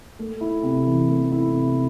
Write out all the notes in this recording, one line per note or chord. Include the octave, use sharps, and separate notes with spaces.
A3
E4
C3
E3
A3
E4
C3